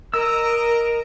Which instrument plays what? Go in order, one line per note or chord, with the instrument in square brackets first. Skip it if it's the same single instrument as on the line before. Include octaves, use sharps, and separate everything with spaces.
[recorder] A#4 [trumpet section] D#5 A#5 [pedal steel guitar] E6